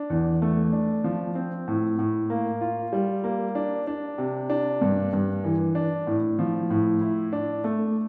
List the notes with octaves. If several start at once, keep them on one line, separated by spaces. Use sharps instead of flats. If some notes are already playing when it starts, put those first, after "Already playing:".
Already playing: D4
E2
A3
D4
F3
C4
A2
A2
A#3
F4
G3
A#3
D4
D4
C3
D4
G2
G2
E3
D4
A2
F3
A2
E4
D4
A3